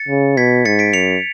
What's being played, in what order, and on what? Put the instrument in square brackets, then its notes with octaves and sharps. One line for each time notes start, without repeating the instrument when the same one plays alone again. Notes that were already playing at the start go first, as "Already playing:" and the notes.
Already playing: [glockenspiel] A6 C#7
[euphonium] C#3
[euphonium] B2 [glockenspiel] G#6 B6
[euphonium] G#2 [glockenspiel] A6 C#7
[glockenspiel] B6 D7
[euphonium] F#2 [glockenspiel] C#7 F7